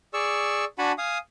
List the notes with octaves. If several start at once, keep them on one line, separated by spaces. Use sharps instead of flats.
G#4 D5 C#6 E6
D4 F#4 F#5 G#5 A5 B5
F5 G#5 D#6